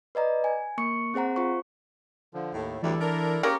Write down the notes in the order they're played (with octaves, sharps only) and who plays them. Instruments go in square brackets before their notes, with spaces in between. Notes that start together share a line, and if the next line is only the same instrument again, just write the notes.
[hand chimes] B4 D5 D#5 A#5
G#5
A#3 C#6 C#7
C4 G#4 C5 F#5 A#5
F4 C5 C#6
[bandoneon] D3 F3
[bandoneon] D#2 [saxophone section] A2
[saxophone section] D2 A2 G3 [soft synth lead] E3 [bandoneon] E4 A4 D5
[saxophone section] D4 A#4
[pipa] A#3 G#4 A#4 [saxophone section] C#4 G4 [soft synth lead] C#6